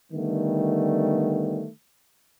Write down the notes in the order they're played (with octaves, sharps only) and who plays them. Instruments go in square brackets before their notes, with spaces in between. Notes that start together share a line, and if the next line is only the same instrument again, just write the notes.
[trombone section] D3 D#3 G3 A3 B3